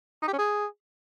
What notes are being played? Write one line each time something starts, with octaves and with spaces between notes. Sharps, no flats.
D#4
G4
C#4
G#4